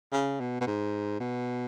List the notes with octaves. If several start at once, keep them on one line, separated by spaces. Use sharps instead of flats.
C#3
B2
B2
G#2
B2